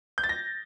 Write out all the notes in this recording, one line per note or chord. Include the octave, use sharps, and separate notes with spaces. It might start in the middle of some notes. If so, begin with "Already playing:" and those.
G6
A6
A#6